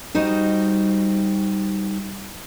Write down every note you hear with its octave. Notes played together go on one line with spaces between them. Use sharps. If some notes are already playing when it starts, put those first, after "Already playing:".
G3 D#4 F#4 C5 D#5